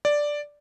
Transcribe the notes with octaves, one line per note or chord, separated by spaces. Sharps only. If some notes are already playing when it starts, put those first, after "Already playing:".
D5